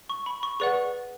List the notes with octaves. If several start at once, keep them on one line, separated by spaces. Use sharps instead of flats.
C#6
B5
C#6
G#4 B4 D5 F#5 C#6